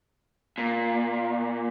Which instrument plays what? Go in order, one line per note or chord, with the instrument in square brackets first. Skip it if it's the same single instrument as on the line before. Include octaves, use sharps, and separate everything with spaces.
[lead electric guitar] A#2